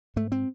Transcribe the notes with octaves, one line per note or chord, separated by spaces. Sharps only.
G#2 A3
C4